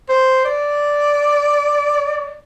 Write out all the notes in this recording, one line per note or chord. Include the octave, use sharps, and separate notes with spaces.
C5
D5